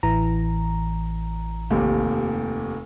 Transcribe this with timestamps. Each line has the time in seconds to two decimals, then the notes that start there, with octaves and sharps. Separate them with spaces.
0.03 A1 E3 A#5
1.71 F1 D#2 G4